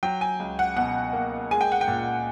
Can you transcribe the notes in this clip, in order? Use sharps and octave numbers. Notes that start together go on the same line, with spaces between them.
F#3 G5
G#5
C#2
F#5
B2 F#5
A#3
G#3 G#5
G5
F#5
G5
A#2